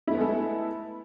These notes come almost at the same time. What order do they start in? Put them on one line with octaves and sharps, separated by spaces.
E4 A3 B3 G#3 A4